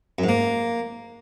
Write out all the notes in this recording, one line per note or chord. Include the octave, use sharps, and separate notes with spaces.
F#2
G#2
A#3